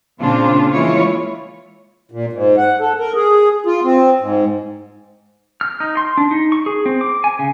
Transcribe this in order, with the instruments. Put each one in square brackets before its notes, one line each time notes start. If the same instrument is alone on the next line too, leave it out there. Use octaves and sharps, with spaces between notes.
[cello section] A#2 C#3 C4 D4 F4
E3 G#3 A#3 E4 F4 C#5
[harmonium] A#2
G#2
F#5
A4
A#4
G#4
F4
C4
G#2
[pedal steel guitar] F6
D#4
C6
D4
D#4
C#6
G#4
C4
D6
G#5
C#3